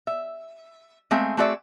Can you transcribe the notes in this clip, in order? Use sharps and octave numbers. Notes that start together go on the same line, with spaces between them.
E5
G#3 A3 C4 G#4 E5 F5
A3 C4 F#4 G#4 D5 E5